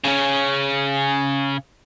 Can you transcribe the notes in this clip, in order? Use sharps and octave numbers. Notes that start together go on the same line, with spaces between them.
C#3 C#4